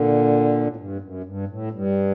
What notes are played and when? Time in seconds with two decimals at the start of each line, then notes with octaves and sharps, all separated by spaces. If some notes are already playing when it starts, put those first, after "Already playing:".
Already playing: A#2 D3
0.67 A2
0.76 G2
1.01 F#2
1.24 G2
1.48 A2
1.71 G2